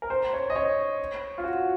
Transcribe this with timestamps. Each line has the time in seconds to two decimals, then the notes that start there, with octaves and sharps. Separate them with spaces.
0.02 A#4
0.10 C5
0.33 C#5
0.50 D#5
0.56 C#5
1.38 F4
1.44 F#4